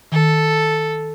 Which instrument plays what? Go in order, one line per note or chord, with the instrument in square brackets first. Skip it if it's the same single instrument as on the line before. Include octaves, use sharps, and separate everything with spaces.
[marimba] D#3 [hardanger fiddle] A4